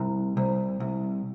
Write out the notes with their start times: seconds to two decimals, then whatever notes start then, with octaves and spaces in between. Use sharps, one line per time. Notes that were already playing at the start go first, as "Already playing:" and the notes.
Already playing: C2
0.37 C2
0.80 C2